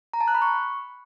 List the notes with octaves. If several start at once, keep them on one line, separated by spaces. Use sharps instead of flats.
A#5
A5
F#6
B5
C#6